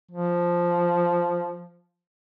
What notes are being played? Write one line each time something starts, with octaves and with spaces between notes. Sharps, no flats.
F3